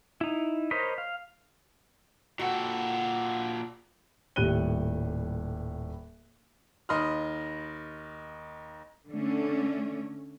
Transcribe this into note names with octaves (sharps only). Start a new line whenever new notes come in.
D#4 E4
A#4 C5 C#5 D#5 B5
F5
A#2 F#4 A4 F#5 G5
D#1 A2 G3 F#6 D#7 G7
D#2 D#5 B5 C6 D#6 F6
D3 A3 C#4